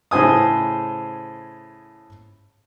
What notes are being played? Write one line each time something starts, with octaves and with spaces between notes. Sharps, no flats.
A2 C#3 C5 G#5 D#6